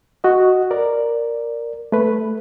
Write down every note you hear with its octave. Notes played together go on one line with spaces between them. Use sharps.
F#4 D#5
A#4 D5
A3 B4